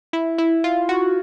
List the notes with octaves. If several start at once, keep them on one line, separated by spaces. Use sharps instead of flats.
E4
E4
F4
F#4